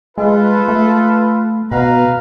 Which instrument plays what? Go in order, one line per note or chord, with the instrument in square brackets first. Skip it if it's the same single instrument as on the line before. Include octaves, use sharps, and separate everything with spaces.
[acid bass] G#3 [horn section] F4 A4 B4
[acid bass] A3
[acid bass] B2 [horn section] B4 F5 A#5